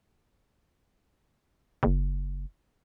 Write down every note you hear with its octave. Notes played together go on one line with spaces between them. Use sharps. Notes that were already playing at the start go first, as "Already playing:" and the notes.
F#1